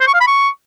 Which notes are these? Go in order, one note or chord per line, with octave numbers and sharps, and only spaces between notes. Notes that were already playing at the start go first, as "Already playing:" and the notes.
C5
C#6
F5
B5
C#6